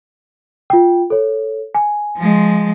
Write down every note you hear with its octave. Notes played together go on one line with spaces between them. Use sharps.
F4 G5
A4 C#5
G#5
F3 G#3